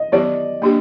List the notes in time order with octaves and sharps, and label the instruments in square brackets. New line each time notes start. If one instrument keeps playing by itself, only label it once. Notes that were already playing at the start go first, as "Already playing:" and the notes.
Already playing: [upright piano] D#5
[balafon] D#3 F#3 B3 E4 G4 [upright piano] D5
[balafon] A#3 D4 G4